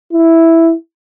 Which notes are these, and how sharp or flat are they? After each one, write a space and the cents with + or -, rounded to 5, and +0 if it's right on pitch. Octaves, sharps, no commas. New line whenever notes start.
E4 +0